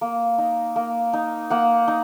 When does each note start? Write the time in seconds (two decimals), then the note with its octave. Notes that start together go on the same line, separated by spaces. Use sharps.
0.01 A#3
0.38 D#4
0.76 A#3
1.13 D#4
1.50 A#3 F#5
1.88 D#4